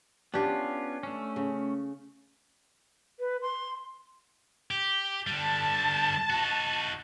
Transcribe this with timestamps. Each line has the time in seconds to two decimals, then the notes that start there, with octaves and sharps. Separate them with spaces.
0.34 B3 C#4 D4 F4 G4
1.03 A3 C#4
1.36 C#3
3.20 B4
3.42 C6
4.71 G4
5.27 D3 G3 A5
6.30 D#4 F#4